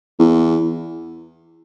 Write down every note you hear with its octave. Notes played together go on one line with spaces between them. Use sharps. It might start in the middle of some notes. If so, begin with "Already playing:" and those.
E2